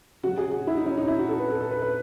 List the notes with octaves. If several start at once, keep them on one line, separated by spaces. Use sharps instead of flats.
C#3 F#3 F#4
G#4
F#4
E4
D#4
C#4
D#4
E4
F#4
A4
B4
A4
A4
B4
B4